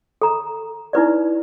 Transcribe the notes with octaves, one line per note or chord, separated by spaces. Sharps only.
A4 A#5
D#4 E4 B4 D5